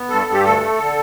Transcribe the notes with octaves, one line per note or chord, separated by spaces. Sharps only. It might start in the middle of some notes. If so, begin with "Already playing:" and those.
Already playing: B3
G2 A4
G2
G4
D2 A4
A3
D3